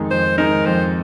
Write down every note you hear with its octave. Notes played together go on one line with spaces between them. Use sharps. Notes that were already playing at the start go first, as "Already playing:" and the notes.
Already playing: F2 D#3 G#3 D#4
F2 C5
D#3 G#3 D#4 A#4
F2 C5